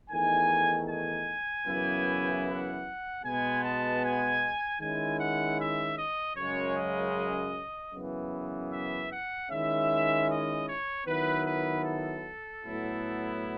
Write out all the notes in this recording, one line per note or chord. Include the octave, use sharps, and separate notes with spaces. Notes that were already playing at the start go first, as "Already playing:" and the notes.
E2 D#3 A3 D#4 G#5
G#5
F#2 C#3 E3 B3 E4
F#5
B2 G#3 B3 G#5
A5
G#5
D#3 G#3 C#4 E4 G#5
F#5
E5
D#5
F#2 C#3 G#3 C#5
D#5
F#2 C#3 E3 B3
E5
F#5
D#3 G#3 C#4 E4 E5
D#5
C#5
D#3 F#3 B3 E4 B4
B4
A4
A2 F#3 B3 E4